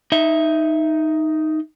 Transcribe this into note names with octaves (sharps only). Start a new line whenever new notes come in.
D#4 E5